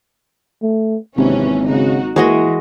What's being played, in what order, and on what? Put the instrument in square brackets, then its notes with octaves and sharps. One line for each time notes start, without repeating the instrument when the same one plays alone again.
[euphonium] A3
[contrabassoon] G#1 [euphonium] C3 [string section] E3 A#3 C#4
[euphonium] C#3 [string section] A#3 D#4 F#4
[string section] E3 A#3 [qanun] G#3 F#4 D#5 [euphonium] E4